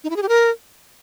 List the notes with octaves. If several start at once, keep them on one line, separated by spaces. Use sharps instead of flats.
D#4
E4
G#4
G4
A#4